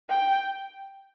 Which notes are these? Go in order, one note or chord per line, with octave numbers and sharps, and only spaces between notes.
G5